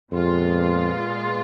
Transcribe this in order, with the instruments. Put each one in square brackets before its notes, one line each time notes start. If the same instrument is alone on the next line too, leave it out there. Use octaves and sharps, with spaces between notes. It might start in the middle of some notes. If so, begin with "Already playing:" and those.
[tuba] F2 [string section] A#2 G#3 B3 F4